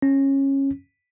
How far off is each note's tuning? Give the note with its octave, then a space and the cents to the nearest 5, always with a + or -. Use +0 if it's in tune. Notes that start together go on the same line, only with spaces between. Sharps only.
C#4 -20